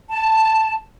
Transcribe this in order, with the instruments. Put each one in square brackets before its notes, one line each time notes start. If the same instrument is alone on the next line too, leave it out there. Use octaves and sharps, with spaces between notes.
[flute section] A5